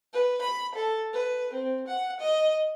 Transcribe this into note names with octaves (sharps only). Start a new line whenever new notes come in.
B4
B5
A4
B4
C4
F#5
D#5